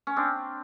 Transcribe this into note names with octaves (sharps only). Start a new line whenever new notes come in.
C#4
C4 D4